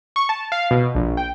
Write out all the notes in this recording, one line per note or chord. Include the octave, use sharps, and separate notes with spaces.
C#6
A5
F5
B2
A#1
G5